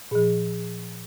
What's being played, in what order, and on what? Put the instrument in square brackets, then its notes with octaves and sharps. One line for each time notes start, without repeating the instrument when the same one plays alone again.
[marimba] A#2 F3 G#4